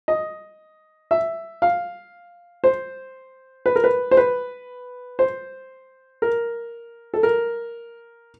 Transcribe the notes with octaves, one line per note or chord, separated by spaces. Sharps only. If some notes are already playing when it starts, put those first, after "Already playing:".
D#5
E5
F5
C5
B4
A#4
B4
C5
B4
C5
A#4
A4
A#4